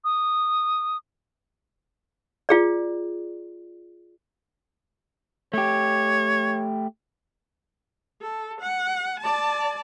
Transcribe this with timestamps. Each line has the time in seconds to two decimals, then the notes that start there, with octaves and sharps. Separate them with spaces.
0.04 D#6
2.49 F4 G#4 D5
5.54 A3 G4 C#5
8.22 A4
8.61 F#5
9.20 D5 A5